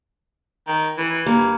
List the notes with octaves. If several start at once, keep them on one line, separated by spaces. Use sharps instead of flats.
D#3
E3
G2 A#3